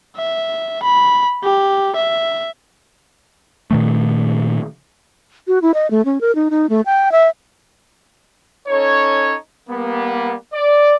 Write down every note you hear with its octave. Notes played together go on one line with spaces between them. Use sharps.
E5
B5
G4
E5
A#2 D#3 A3
F#4
E4
D#5
A3
C#4
A#4
D#4
D#4
A3
G5
E5
C#4 D#4 A4 C#5
G3 A#3 B3
D5